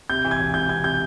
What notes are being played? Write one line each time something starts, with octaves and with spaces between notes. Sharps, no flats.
C3 G6
E3
G#6
E1
C3 G6
C3 G#6
C3 G6